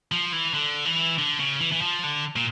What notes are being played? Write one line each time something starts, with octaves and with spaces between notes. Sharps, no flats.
F3
E3
D3
E3
D3
C#3
E3
E3
F3
D3
A#2